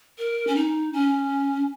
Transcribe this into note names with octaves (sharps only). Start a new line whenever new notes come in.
A#4
C#4
D#4
C#4